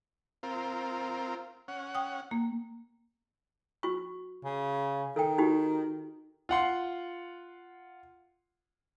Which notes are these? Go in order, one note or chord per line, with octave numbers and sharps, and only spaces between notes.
C4 F4 A#4
C#4 F#5
G5 D#6
A#3
F#4 C#6
C#3
D#3 A4 G5
D#4 F#4 G4
F4 F#5 C6